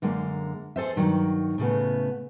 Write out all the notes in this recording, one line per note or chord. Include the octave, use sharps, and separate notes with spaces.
F#2 D3 G#3 A#3
G#4 A4 C5 E5
G2 D#3 F#3
A2 C#3 A3 B3